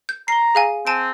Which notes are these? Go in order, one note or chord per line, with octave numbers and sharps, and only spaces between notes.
G6
A#5 C7 G7
G#4 F5 G#5
C4 G#5 A5 D7